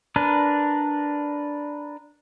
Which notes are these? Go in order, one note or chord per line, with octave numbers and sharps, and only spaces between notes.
D4 A#4 B4